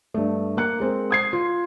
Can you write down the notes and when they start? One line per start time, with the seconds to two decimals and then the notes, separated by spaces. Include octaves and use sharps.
0.14 G2 A3
0.57 A#3 F#6 C#7
0.80 G#3 C4 A#4
1.11 D#6 G#6 C7
1.33 F4